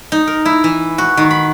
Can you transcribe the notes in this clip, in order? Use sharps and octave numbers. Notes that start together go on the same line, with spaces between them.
D#4
A#4
E4
E3
F#4
D#3
B5